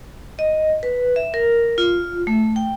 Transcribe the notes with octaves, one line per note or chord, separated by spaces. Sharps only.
D#5
B4
E5
A#4
F4
A3
G5